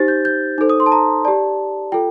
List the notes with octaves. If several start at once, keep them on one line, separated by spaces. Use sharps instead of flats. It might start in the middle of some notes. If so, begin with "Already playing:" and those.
Already playing: D#4 G4 C5 A6
G6
G6
D#4 A4 C5
D#6
C6
A5
A#5
G4 D5 A5
F4 A4 G5